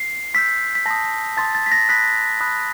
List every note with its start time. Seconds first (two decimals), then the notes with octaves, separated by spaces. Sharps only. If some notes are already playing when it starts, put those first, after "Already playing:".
Already playing: C7
0.34 C6 E6 G6 B6
0.75 B6
0.86 A5 C6 D#6 A#6
1.37 A5 C6 D#6 A6
1.55 A6
1.66 B6
1.72 A#6
1.89 B5 D#6 F#6 B6
2.40 B5 D#6 F#6